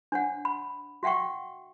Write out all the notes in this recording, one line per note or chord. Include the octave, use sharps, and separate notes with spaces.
D4 C#5 F#5
B5
F#4 E5 F#5 G5 C#6